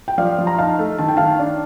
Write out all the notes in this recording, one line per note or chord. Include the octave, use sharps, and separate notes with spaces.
G5
F3 D5 F5
F3
A#5
D#4 F5 A5
A3
D#3 A5
G5
D#3 F5 A5
D4